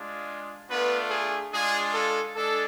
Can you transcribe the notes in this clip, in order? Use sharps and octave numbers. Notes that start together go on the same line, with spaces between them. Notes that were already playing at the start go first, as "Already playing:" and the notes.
Already playing: G#3 D4 F4
A3 B3 D4 F4 B4
G#4
G#3 D4 F4 G#4
A4
G#3 D4 A4